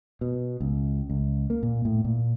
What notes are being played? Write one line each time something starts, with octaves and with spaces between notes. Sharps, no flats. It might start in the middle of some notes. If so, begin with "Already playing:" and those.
B2
C#2
C#2
A#3
A#2
A2
A#2